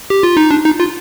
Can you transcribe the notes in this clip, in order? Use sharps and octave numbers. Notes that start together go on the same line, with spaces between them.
G4
F4
D#4
D4
D#4
F4